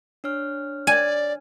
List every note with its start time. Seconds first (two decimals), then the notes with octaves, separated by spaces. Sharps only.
0.24 D4 C#5 F6
0.87 D5 G#5